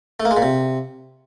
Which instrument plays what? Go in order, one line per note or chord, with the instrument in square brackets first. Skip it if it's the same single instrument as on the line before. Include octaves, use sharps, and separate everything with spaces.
[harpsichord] A3
A#3
G#3
A#2
C3